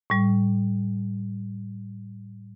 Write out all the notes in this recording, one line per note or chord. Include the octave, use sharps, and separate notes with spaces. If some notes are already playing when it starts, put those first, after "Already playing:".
A2 G3